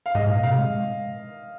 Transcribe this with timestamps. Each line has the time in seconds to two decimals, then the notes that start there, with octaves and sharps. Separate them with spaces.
0.06 F5
0.15 G#2 D#5
0.29 A#2
0.43 C3 F5
0.59 G#3